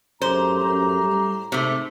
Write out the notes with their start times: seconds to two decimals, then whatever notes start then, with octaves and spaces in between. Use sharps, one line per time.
0.22 F#2 A2 G4 C5 A#5
0.63 F#2
1.02 G3
1.52 G#2 C3 A3